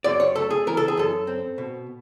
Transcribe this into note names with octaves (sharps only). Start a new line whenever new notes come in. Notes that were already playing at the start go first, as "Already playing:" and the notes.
F#2 D5
C#5
A3 A4
G#4
E3 A#4
A4
G#4
F#2 A4
C4
B2